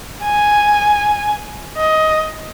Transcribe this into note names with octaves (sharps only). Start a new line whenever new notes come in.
G#5
D#5